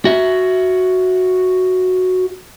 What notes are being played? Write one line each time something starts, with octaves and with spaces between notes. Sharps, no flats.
F#4 E5